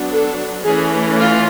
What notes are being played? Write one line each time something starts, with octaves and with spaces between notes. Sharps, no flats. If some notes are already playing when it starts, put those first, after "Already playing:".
Already playing: F#3 B3 D4
A4
E3 A3 C#4 G#4
F4